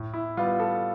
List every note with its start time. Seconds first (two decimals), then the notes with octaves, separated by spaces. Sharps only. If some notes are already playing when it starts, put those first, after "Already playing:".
Already playing: A2
0.14 E4
0.37 G3 B3 F4
0.60 A4